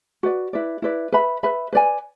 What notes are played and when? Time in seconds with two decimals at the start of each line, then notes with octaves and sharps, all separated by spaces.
0.23 F#4 B4 D5
0.53 E4 B4 D5
0.82 E4 B4 D5
1.12 B4 E5 B5
1.43 B4 E5 B5
1.73 B4 D5 G#5